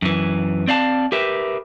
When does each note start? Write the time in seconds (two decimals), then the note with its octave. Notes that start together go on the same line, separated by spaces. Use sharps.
0.02 F#2 E3
0.67 C4 D5 F5 A5
1.12 G4 A#4 B4 E5